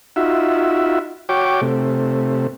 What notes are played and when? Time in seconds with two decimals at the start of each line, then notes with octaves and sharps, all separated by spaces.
0.16 D#4 F4 F#4 E5
1.29 F#4 C#5 G5 D6
1.61 C3 A3